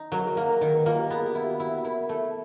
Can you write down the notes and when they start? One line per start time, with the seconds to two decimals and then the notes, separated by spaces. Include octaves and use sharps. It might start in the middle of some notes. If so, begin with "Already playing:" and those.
Already playing: D#4
0.12 F#3 A#4
0.25 A#4
0.36 A#3 A#4
0.49 A#4
0.61 D#3 A#4
0.74 B4
0.86 A#3 F4
0.99 G4
1.10 B3 G#4
1.27 F#4
1.35 E4
1.44 G4
1.60 E4 F#4
1.85 E4 A#4
2.09 A3 A4